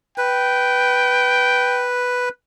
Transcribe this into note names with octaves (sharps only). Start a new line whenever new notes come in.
B4 G5